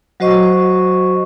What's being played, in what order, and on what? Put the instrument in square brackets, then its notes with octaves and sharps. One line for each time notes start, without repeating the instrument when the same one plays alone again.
[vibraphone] F#3 F#4 C5 D#5 C#6